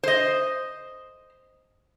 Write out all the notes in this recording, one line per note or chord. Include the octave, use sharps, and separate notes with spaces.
C5 D#5